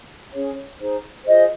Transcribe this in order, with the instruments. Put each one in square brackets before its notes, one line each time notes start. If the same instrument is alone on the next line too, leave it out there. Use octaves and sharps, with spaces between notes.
[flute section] C#4 G#4 C#5
D#4 G#4 C5
F4 G#4 C5 D#5